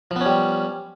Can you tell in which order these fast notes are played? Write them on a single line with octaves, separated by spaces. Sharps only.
F3 B3 C#4 G3